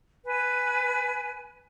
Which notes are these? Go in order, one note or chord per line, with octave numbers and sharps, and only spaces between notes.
B4 G#5